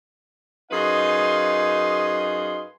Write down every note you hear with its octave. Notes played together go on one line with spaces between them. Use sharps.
F#2 D#4 G#4 B4 F5 C6